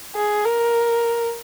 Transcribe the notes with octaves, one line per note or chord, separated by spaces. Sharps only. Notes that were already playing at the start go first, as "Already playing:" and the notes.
G#4
A#4